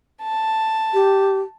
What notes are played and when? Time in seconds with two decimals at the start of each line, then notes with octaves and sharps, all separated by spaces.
0.23 A5
0.94 G4